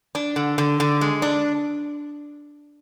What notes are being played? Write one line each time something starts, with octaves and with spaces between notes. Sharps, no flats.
D4
D3
D3
D3
G#3
D4